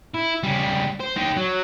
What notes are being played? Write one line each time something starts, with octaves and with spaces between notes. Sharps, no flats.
E4
C#3 G3
C5
D#4 G4
F#3